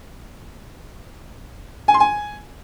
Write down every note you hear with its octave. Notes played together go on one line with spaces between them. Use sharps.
G#5
C6
G#5